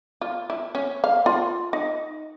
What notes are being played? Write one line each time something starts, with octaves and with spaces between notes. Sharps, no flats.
F4
E4
C#4
F5
F4
D#4